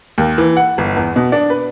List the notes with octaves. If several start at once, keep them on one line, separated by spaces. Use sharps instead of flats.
D#2
E3
F#5
G1
E2
B2
D4
B4